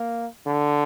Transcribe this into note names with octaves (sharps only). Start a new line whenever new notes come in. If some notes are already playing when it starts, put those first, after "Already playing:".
Already playing: A#3
D3